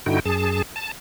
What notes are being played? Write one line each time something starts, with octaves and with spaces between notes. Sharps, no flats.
G2 D3 D#4 E4 F#4 G5
F#2 G#4 A5
A5